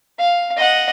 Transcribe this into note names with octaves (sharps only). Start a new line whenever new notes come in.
F5
D#5 F#5